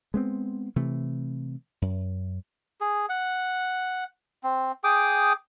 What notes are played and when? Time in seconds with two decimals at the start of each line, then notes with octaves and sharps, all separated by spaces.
0.14 G#3 B3 C4
0.76 C3 E3 A3
1.82 F#2
2.81 G#4
3.09 F#5
4.44 C4
4.84 G#4 G5 D6 D#6